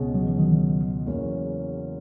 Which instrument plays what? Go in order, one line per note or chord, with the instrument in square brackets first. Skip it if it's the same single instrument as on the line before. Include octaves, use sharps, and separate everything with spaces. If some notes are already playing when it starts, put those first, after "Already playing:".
Already playing: [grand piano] C#2 B2 G#3 C#4 G#4
[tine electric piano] F#3
E3
D#3 F#3
[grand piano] E2 C#3 F#3 A#3 C#4